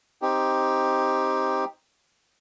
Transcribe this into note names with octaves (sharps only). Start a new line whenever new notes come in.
C4 D#4 G4